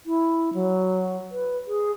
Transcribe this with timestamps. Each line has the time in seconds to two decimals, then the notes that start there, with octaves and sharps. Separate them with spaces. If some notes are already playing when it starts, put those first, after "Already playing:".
0.06 E4
0.54 F#3
1.31 B4
1.67 G#4